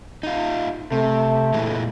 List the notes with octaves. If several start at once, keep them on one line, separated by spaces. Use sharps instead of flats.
D#4 F4
C3 A3
A#2 E3 G#3